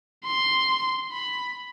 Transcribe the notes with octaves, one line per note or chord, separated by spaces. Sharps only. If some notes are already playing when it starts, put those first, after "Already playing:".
C6
B5